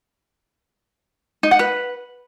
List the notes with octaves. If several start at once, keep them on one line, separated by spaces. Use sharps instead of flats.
D#4
F#5
B4